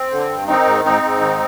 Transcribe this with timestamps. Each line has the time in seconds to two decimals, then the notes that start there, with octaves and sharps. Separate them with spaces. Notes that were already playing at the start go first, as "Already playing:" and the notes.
Already playing: C4
0.11 D3
0.30 G2
0.48 D#3 C4 D#4
0.66 G#2
0.84 G#2 C4 D#4
1.02 G#2
1.20 D#3